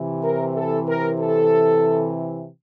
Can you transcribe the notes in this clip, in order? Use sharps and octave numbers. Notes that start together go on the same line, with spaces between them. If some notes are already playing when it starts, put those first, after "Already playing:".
Already playing: C3 E3
A#4
A4
A#4
A4